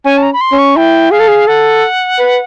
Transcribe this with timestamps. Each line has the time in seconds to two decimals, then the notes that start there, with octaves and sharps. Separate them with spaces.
0.05 C#4 G#5
0.18 A5
0.23 A#5
0.33 B5
0.41 C6
0.52 C#4
0.58 C#6
0.76 E4 G5
1.11 G#4 F5
1.20 A4
1.28 G#4
1.47 A4 F#5
2.19 B4